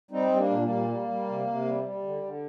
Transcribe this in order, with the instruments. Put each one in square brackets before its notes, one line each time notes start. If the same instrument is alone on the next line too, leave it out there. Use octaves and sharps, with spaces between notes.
[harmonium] G3 C4 D#4
G3
A#3 D4
A#2
G3 A#3
A#2
G3
G3
C3
C3
G3
G3
D3
D3